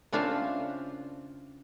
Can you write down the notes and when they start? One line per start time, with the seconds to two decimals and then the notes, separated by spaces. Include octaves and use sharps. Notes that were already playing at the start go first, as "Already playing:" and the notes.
0.12 C#3 C4 D4 F4 E5 F5